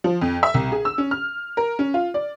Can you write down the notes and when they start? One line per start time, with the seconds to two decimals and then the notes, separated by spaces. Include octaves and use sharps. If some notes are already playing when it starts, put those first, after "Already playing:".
0.04 F3
0.21 F2
0.43 E5
0.54 C2
0.72 G#4
0.85 E6
0.98 C#4
1.11 F6
1.57 A#4
1.79 C#4
1.94 F4
2.14 D5